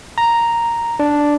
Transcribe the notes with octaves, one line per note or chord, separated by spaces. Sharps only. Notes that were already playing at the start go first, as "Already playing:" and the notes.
A#5
D4